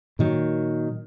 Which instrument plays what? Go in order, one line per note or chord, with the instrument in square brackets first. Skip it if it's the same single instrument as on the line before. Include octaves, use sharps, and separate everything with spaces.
[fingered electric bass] A#2 D#3 F#3